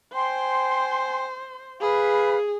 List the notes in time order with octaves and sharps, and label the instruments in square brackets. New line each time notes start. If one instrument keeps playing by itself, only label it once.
[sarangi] C5 [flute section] G5 G#5 C6
[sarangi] G#4 [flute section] B4 F5 B5